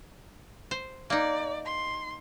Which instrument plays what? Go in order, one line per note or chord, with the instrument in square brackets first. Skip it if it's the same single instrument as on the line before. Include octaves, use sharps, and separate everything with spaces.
[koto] C5
[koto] A#3 D#4 [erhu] D5
[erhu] C6